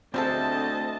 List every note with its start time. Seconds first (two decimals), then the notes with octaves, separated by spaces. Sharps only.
0.14 D2 G3 G#3 C4 A4 D#5 A5